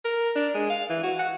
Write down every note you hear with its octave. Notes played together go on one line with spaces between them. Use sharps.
A#4
D4
G#3
F5
E3
F#4
F#5